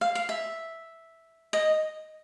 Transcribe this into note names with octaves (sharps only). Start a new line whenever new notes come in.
F5
F5
E5
D#5